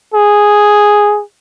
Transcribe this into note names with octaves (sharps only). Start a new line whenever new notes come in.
G#4